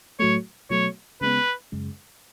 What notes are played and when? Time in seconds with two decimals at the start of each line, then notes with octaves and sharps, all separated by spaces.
0.20 A2 F#3 A3 C#5
0.70 B2 F#3 A3 C#5
1.21 C#3 G#3 B3 B4
1.72 F#2 C#3 G#3